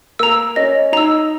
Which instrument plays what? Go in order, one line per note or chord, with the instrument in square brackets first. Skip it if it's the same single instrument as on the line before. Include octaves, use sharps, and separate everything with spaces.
[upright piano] A#3 A#4 [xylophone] A#5 E6
[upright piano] C#4 C#5 [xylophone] D#5
[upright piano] D#4 D#5 [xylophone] A#5 E6